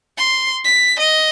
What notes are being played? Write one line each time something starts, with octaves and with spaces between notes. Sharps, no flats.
C6
B6
D#5